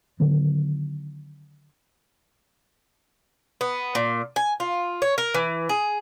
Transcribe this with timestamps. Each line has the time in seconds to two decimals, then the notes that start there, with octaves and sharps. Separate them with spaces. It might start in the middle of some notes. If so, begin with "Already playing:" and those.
0.20 D3 D#3 F#3 B3
3.61 B3
3.95 A#2
4.36 G#5
4.60 F4
5.02 C#5
5.18 A#4
5.34 E3
5.69 G#4